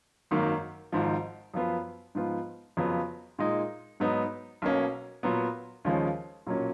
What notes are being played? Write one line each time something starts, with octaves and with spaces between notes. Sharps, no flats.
G#1 F#2 D#3 A#3
G#1 G#2 F3
F#2 F3 B3 F4
G#2 F3 B3 F4
F2 C#3 F#3 B3 F4
A#2 G#3 D#4
G#2 F#3 B3 D#4
B1 B2 A#3 C#4
A#2 F#3 B3
D#2 C#3 F3 G#3 C#4
B1 A#2 F#3 A#3 C#4